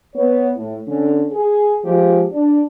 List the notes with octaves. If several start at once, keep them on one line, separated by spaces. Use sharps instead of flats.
B3 C#5
A2
D3 C#4
G#4
F3 G#3 F4 G4
D4